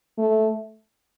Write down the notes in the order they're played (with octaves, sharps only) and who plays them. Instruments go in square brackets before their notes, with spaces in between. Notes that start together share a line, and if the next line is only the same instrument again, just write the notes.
[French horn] A3